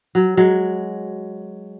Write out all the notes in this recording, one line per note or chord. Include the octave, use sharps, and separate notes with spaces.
F#3
F#3 G#3